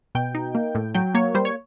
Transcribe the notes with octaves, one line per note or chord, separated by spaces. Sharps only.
B2 G5
D#4
A#3
A2
F#3 G5
A#3 C#5
G3 C5
C#5